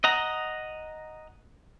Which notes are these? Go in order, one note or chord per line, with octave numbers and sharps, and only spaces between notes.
D#5 F#5 A#5